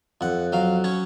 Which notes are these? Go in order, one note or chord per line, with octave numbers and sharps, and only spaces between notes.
F2 F#5
F#3 F5
C#4 C#5